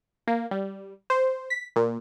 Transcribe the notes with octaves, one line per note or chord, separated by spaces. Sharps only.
A#3
G3
C5
B6
A#2